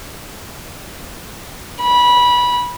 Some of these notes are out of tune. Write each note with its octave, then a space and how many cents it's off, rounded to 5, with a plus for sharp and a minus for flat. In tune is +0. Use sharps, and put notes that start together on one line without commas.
B5 -20